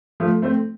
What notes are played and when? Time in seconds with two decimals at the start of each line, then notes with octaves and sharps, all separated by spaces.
0.20 F3 A3
0.42 A3 C4